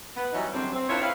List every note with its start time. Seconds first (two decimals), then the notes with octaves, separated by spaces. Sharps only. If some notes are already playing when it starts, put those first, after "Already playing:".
0.16 B3
0.33 E3 F#3 G3 C#4 D#4
0.53 F#2 D3 F#3 G3 C4
0.73 C4
0.88 D4 E4 F4 A#4 C5 C#5
1.01 E4 G4 B4 C5 F5